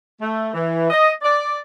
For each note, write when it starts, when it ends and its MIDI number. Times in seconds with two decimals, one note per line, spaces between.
0.21 0.49 57
0.54 0.90 52
0.90 1.10 75
1.22 1.57 74